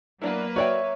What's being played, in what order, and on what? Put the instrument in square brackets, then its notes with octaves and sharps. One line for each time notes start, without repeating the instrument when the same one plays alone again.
[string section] F#3 A#3 B4 [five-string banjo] B3 D4 E4
[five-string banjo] F#4 D5 G5 [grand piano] C#5 E5